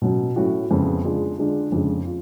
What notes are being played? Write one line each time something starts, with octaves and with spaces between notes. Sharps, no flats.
B2 F#3 C#4 F#4
A2 F#3 C#4 F#4
F2 C#3 G#3 B3
C#3 G#3 D4 F4
D3 G#3 D4 F4
F2 C#3 G#3
F4